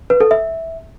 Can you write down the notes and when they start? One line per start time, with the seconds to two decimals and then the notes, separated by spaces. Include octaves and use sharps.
0.10 B4
0.20 A4
0.31 E5